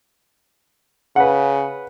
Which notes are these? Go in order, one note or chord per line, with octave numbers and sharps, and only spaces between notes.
C#3 B4 F#5